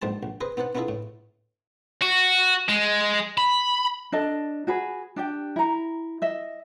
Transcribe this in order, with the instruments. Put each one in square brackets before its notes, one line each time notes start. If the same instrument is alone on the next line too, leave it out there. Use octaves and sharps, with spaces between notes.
[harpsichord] A#1 G#2 G3 C5 A5
A#1
G#4 B4 C5 D#5
B3 D#4 C5 D5 F#5
B3 D4 E4 F4 G#4 A4
A2
[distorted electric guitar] F#4
G#3
B5
[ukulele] D4 A4 D#5 A5
F#4 G#4 B4
D4 G4 G5
E4 A#5
D#5 E5